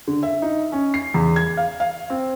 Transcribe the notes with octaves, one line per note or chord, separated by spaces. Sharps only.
D3
E5
D#4
C#4
C7
E2
G#6
F5
F5
C4